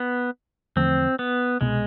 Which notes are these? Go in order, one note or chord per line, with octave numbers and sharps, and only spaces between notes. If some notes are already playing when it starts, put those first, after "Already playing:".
Already playing: B3
E2 D3 F3 A3 C4
B3
C2 B2 G#3 B3